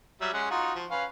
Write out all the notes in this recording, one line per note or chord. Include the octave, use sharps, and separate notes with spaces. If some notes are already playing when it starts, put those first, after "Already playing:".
F#3 G3 E5
G#3 C#4 F#5
D#4 F4 F#4
F3
C#4 B4 F5